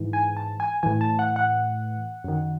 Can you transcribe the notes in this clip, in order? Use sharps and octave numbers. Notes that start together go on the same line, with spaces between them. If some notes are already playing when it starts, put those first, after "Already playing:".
Already playing: G#2 E3
G#5
A5
G#5
A2 E3 G#5
A5
F#5
F#5
F#2 D#3